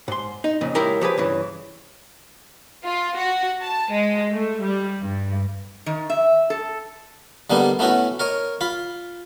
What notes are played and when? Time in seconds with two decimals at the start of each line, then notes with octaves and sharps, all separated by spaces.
0.08 G#2 C6
0.44 D#4
0.61 F2 A#2 C#3
0.75 C#2 G#3 E4 G4 A#4 A#5
1.01 F3 G4 G#4 B4
1.18 G2 C#3 E3
2.84 F4
3.16 F#4
3.62 A5
3.91 G#3
4.31 A3
4.63 G3
5.01 G2
5.86 D#3
6.10 E5
6.50 A4
7.50 D3 G3 A#3 B3 D#4
7.79 A3 B3 C#4 E4 F#4
8.19 A#4 C#5 D#5
8.61 F4 B5